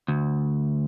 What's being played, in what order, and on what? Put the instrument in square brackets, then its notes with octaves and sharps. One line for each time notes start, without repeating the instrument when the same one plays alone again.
[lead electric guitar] D2